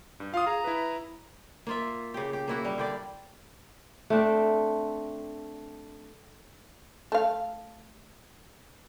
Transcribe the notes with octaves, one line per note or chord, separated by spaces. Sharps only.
G2
F4 F5 D#6
G#4 A#5
E4 B4
A#3 F4 E5
C#3 G4
G4
A#3 E4 F#4
G3
D3 G4 D5
A3 C4 D4
A3 F5